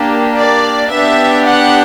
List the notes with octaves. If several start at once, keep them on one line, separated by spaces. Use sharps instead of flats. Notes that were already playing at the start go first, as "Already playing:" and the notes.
Already playing: A#3 D4 G4
D5
B3 D4 G4 E5
F#5